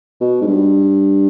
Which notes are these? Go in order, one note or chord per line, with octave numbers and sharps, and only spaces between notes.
B2
G#2
G2